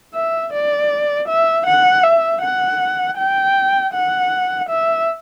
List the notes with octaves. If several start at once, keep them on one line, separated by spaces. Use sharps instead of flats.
E5
D5
E5
F#5
E5
F#5
G5
F#5
E5